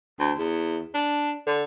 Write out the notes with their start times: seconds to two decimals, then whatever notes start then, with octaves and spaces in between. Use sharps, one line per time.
0.19 D2
0.38 E2
0.94 D4
1.46 D3